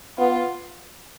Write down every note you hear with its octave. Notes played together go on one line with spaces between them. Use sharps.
B3 F4